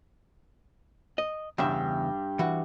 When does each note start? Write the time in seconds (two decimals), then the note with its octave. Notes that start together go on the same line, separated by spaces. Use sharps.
1.18 D#5
1.58 E2 G2 C#3 E5 G5
2.39 E3 F#4